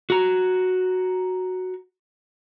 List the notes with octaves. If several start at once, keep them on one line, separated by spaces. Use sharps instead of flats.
F#4 A#5